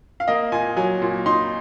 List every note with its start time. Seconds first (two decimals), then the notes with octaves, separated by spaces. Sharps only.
0.20 F5
0.28 A#3 D#5
0.52 A#2 G#5
0.77 F#3 G#5
1.02 A#2
1.26 D#4 C6